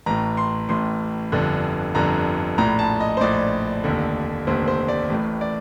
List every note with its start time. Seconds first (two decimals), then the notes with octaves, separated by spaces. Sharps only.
0.06 A1 A2 A#5
0.37 C6
0.69 A1 A2 C6
1.32 G1 F2 D3
1.95 G1 F2 D3 A#5
2.58 A#1 A2 A#5
2.79 A5
3.00 D#5
3.17 C5
3.21 A#1 A2 D5
3.84 F1 D#2 D3
4.47 F1 D#2 D3 C5
4.68 C5
4.88 D5
5.10 A1 A2
5.41 D5